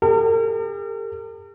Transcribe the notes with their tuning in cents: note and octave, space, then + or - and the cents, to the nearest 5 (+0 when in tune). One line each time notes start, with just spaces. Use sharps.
G4 +45 A#4 -45